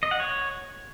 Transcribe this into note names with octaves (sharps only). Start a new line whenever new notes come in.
D#5
F#5
C#5